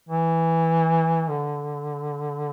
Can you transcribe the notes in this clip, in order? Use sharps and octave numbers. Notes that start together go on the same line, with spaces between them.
E3
D3